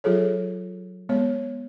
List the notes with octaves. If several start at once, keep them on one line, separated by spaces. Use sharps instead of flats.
F#3 F4 G#4 A4 C#5
G#3 B3 C#5